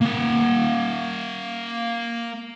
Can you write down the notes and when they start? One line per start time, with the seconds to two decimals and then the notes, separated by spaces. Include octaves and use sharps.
0.01 A#3 F#5